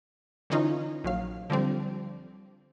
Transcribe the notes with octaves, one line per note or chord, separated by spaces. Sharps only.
D3 E3 C#4 D#4 F4
A#1 F#3 F5
D3 F3 G3 C4